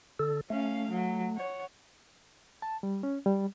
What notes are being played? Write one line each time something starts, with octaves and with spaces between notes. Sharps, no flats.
D3 A4
A3 C#4 F5
F#3
C#5 F#5
A5
G3
C#4
G3